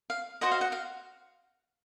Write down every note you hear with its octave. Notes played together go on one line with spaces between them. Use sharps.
F5
F#4 C5 D#5 F#5
F5
F#5
F5